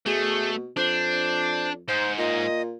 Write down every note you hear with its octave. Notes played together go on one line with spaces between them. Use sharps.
B2 A3 G#4
F2 D4 C5
G#2 C5
A#2 D#5